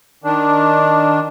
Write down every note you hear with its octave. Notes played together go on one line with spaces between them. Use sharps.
D#3 D4